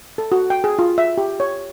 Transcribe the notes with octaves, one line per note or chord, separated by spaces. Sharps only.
A4
F#4
G5
G#4
F4
E5
G4
C#5